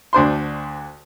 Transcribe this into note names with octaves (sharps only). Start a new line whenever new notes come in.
D2 D4 C5 C6